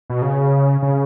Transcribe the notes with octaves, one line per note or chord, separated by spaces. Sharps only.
B2
C#3
C#3